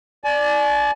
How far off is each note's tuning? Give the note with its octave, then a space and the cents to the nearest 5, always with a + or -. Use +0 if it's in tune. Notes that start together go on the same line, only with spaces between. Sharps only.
D5 +0 G#5 +45